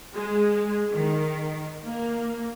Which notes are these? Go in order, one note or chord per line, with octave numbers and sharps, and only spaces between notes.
G#3
D#3
A#3